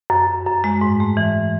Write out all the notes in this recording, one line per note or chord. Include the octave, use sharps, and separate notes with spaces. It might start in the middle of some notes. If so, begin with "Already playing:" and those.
F#2
F#2
F#2
G#3
G#2
A3
E3